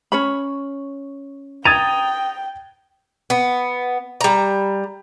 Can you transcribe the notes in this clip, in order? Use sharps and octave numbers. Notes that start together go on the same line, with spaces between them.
C#4 C#5 B5
G5 A#5 D#6 G#6 A6 D#7
B3
G3 A#5